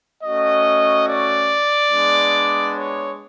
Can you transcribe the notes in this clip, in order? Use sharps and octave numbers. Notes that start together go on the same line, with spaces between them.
A3 C#4 F#4 D#5
D5
G#3 B3 D4
C#5